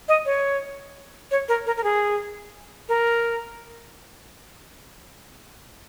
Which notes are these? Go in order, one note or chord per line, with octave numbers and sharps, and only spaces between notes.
D#5
C#5
C#5
A#4
A#4
A#4
G#4
A#4